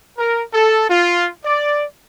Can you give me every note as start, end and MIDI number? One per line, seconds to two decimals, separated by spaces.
0.18 0.42 70
0.53 0.88 69
0.89 1.28 65
1.44 1.83 74